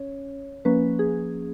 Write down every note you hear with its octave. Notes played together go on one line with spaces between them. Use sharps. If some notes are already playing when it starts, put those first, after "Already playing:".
Already playing: C#4 C#5
F3 A#3 C#4 B4
G#4